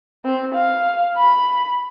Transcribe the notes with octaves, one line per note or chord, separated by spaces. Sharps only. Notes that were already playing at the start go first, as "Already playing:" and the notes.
C4
F5
B5